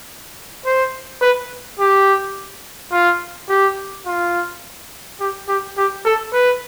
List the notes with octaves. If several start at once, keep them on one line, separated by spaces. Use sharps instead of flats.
C5
B4
G4
F4
G4
F4
G4
G4
G4
A4
B4